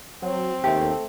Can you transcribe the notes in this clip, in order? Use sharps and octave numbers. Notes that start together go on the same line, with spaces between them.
F#3 C4
D#2 A3 G4